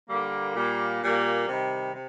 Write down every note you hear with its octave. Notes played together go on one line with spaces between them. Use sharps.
D3 G3 A#3
A#2 G3 A#3
A#2 G3 A#3
C3 D#3 G3
C3